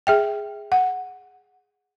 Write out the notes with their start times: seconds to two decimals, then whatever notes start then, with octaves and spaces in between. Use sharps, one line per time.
0.07 G#4 E5 G5
0.72 F#5